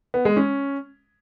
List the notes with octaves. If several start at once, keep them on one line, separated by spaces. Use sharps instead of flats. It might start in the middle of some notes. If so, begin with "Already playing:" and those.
B3
G#3
C#4